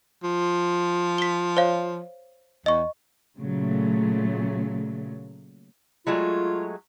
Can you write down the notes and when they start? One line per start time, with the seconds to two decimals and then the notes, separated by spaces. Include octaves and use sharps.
0.24 F3
1.18 B6 G7
1.57 C5 C#5 F5
2.66 E2 D#5 C#6
3.39 A#2 C#3 F#3 A3
6.07 F#3 G#3 A3 F4